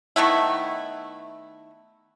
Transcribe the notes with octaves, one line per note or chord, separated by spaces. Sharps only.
D#3 A3 B3 E4